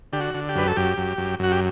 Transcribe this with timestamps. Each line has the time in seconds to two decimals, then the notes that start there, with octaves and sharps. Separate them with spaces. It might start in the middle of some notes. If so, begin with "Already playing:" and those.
0.13 D3 G4
0.21 F#4
0.34 D3
0.49 G4
0.56 F#2 B4
0.67 A4
0.76 F#2 G4
0.98 F#2
1.18 F#2
1.39 F#2 F#4
1.52 G4